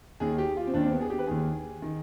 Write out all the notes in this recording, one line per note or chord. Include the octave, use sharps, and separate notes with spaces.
D#2 D#3 G#4
G4
F4
C4
D#2 D#3 D4
C4
B3
G#4
G4
B4
D#2 D#3 G#4
D#3